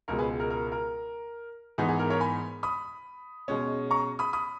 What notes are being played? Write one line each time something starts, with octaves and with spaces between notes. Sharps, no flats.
C#2 B2 G#3 A#4
G#4 B4
A#4
A#4
A#4
G#2 E3 B3 D#4 G#4
G#4
A#4
A#4 C#5
G#5 B5
B5 D#6
B2 G#3 C#4
A#5 C#6
B5 D#6
B5 D#6